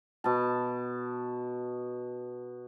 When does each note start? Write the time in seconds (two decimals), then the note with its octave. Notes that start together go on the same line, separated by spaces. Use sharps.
0.24 B2 A5